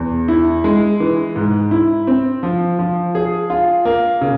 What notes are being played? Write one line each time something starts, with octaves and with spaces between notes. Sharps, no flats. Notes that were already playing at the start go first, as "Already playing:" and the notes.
Already playing: E2
E4
G#3
E3
G#2
E4
C4
F3
F3
G#4
F4
A#3
C#3